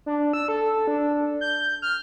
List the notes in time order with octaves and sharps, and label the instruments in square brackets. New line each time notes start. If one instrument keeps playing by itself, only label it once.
[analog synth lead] D4
E6
A4
D4
G6
F6